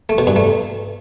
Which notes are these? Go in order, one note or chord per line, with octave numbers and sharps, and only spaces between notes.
A3
B2
G2
A3